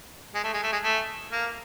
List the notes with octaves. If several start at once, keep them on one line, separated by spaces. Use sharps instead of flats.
G#3
A3
G#3
A3
G#3
A3
A#3